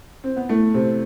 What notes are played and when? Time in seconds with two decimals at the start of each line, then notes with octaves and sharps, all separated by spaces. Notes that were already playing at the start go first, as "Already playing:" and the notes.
0.24 C4
0.36 B3
0.49 A2 A3
0.74 C3 C4